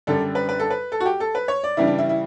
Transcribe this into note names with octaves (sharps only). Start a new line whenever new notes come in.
F#2 D3 G3 D4 A4
B4
B4
A4
B4
A4
F#4
G4
A4
B4
C#5
D5
C#3 E3 G3 D4 E4
D4
E4
E4